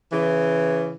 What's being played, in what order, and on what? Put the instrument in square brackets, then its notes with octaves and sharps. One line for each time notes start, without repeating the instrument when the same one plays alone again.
[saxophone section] C#3 E3